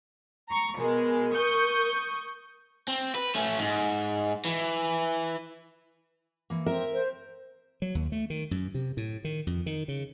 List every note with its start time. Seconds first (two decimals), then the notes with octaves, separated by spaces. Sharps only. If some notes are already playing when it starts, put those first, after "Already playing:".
0.49 A#5 C#6
0.79 B2 G#3 A#4
1.35 C#6 D#6 G6
2.88 C4
3.15 B4
3.35 A3 C#4
3.59 G#2
4.45 E3
6.50 E3 A#3
6.66 C4 A#4 E5
6.93 C5
7.82 F#3
7.95 D#2
8.12 A3
8.30 D#3
8.51 F#2
8.75 C3
8.97 A2
9.24 D#3
9.47 F2
9.66 D#3
9.88 C#3